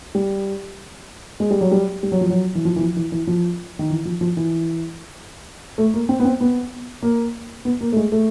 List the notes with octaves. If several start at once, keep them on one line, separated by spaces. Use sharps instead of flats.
G3
G#3
G3
F#3
G3
G3
F#3
F3
F#3
E3
F3
E3
F3
E3
E3
F3
D#3
E3
F3
F3
E3
A3
A#3
C4
B3
C4
B3
A#3
B3
A#3
A3
G#3
A3